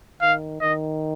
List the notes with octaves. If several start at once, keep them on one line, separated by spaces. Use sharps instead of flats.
D#3 F5
D#3 D#5